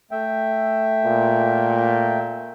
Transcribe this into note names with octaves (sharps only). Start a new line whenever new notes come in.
A3 E5 G5
A#2